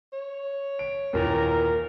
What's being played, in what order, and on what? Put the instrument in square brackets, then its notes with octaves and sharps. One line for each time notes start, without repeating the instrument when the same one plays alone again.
[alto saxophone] C#5
[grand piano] D7
[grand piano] D#2 A#2 E3 [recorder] A#4